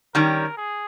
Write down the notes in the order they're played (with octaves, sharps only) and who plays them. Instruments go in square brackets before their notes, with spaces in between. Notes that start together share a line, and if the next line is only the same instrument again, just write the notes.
[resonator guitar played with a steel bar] D#3 G3 C#4 [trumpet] A#4
[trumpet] G#4